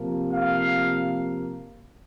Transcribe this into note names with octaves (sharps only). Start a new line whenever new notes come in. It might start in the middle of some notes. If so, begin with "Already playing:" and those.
Already playing: C3 F3 A#3
F5